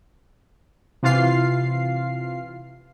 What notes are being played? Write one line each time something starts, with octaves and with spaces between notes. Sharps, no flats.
C3 E3 F4 F5 C7